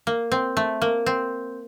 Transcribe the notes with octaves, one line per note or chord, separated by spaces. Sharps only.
A#3
C4
A3
A#3
C4